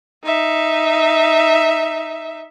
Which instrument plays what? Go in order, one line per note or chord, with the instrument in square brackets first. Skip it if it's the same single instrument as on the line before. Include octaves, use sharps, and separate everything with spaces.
[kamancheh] D#4 E5